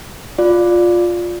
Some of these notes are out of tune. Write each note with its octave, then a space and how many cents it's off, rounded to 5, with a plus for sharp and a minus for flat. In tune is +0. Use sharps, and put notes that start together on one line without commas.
F4 +10 D5 +0